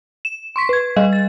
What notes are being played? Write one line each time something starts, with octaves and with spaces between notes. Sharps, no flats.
E7
C6 C#6 B6
B4 G#6
G3 D#5 F5
A6